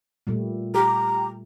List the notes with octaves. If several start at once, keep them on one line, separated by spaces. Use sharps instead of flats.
A#2 G3 A3
G4 A#5